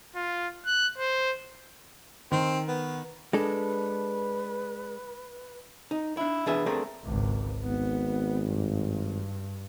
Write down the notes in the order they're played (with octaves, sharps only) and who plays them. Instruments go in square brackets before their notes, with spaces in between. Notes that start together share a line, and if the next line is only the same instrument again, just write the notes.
[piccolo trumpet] F4
F#6
C5
[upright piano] D#3 [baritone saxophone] C4
[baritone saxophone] B3
[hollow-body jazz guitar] G#3 D4 A4 [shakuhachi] B4
[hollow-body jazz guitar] D#4
D4 E4
E3 D4 G#4 B4 E5
A3 C4 D4 G#4 A#4
[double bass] G#1 C#2
[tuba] G#1 [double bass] B3
[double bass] G2